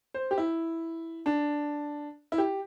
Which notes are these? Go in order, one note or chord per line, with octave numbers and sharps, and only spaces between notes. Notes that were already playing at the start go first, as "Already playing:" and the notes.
C5
G4
E4
D4
E4
G4